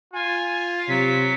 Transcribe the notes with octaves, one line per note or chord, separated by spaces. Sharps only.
F4 G#5
C3 F#3 B6